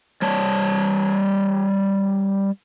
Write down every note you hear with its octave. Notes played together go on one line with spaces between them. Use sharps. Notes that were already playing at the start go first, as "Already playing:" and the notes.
G3 C#5 A5